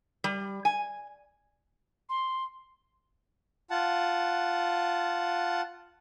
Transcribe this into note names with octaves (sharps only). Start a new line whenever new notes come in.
G3
G#5
C6
F4 F#5 A5